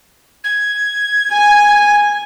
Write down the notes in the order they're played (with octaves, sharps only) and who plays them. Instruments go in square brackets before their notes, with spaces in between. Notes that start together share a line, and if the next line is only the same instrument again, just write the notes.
[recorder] G#6
[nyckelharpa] G#5